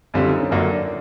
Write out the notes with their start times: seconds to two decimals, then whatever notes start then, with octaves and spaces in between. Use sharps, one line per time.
0.14 F#2 D3 G3 C4 F4
0.26 D#4
0.40 C#4
0.51 F#2 D3 F#3 A#3 D4
0.70 D4